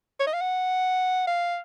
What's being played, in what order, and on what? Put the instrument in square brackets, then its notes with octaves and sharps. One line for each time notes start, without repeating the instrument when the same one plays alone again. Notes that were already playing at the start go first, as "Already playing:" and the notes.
[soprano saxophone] C#5
D#5
F5
F#5
F5